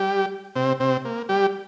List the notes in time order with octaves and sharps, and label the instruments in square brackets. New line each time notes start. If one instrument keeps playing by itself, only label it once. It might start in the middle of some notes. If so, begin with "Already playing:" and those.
Already playing: [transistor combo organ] G3 G4
C3 C4
C3 C4
A#3
G3 G4